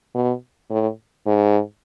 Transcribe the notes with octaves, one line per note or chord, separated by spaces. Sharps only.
B2
A2
G#2